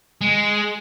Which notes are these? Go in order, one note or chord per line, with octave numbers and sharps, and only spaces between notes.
G#3